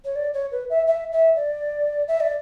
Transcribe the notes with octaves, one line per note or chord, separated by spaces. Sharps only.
C#5
D5
C#5
B4
E5
E5
E5
D5
E5
D5